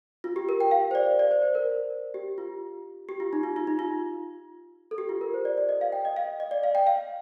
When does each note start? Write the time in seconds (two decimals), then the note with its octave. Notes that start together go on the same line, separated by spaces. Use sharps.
0.24 F4
0.36 G4
0.49 A#4
0.61 G5
0.71 F5
0.91 C5
0.95 D5
1.19 D5
1.31 C5
1.42 C5
1.55 A#4
2.14 G4
2.38 F4
3.09 G4
3.20 F4
3.33 D#4
3.43 F4
3.56 F4
3.67 D#4
3.79 F4
4.91 A4
4.98 G4
5.09 F4
5.21 A#4
5.34 C5
5.45 D5
5.58 D5
5.69 D#5
5.81 F5
5.93 G5
6.05 D#5
6.16 F5
6.40 D#5
6.51 D5
6.63 F5
6.75 G5
6.87 F5